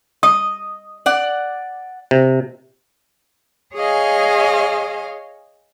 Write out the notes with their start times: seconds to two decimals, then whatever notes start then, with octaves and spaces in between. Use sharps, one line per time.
0.23 D#5 D#6
1.06 D5 F#5
2.11 C3
3.75 G#4 C#5 D#5 F5 G#5